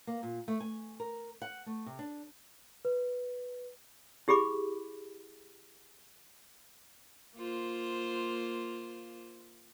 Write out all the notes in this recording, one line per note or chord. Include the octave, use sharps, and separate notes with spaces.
A#3
A#2
A3
G#5
A#4
F#5
A3
C3
D4
B4
E4 G4 G#4 B5 D6
A#3 F4 C5